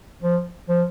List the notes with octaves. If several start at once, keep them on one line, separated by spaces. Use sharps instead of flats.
F3
F3